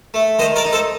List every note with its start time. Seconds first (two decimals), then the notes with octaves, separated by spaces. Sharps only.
0.14 A3
0.39 D#3 C5 D#5
0.56 A#4 D5
0.65 D#4
0.73 A4 C5